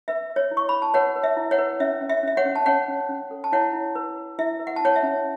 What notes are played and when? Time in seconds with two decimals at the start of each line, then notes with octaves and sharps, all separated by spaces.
0.08 B4 E5
0.30 B4
0.36 C#5
0.51 E4
0.57 C#6
0.69 E4 B5
0.82 A5
0.94 B4 C#5 F#5
1.16 B4
1.23 E5
1.37 E4
1.51 C#5 F#5
1.58 B4
1.80 C#4 E5
2.01 C#4
2.10 E5
2.23 C#4 E5
2.37 C#5 F#5
2.45 C#4
2.56 A5
2.66 C#4 C#5 F#5
2.88 C#4
3.09 C#4
3.31 A4
3.44 A5
3.52 E4 C#5 F#5
3.73 E4
3.95 B4
4.16 B4
4.39 E4 E5
4.59 B4
4.67 F#5
4.76 A5
4.81 E4 C#5 F#5
4.96 E5
5.03 C#4